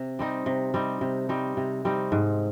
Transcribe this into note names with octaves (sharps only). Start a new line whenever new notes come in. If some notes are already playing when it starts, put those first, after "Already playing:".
Already playing: C3
G3 C4 D#4
C3
G3 C4 D#4
C3
G3 C4 D#4
C3
G3 C4 D#4
G#2